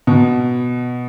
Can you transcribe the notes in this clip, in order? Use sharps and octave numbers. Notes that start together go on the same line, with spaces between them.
B2